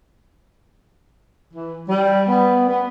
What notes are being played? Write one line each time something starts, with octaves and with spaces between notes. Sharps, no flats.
E3
G3
B3
B3